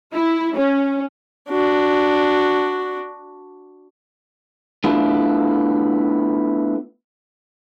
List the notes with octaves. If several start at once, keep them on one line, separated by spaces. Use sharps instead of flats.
E4
C#4
D4 F#4
A3 B3 D4 E4 F4